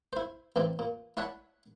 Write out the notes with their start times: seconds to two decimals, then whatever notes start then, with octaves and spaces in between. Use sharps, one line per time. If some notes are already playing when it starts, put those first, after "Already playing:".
0.13 E4 C5
0.56 A1 E3 C4 D5
0.79 A#2
1.17 E4 C#5 D5 F#5 A5 B5